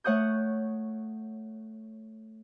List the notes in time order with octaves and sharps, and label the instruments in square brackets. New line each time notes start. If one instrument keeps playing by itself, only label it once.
[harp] A3 C#5 F#5 D#6 G6